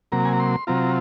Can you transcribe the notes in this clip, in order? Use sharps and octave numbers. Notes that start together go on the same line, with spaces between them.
C3 F#3 A#3 A#5
G#5
A#5
C6
C3 F#3 C4 F4 A#5